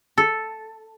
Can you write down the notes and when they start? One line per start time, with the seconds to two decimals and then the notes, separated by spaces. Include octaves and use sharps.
0.18 A4